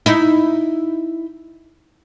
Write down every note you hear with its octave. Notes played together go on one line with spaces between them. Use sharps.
D#4 E4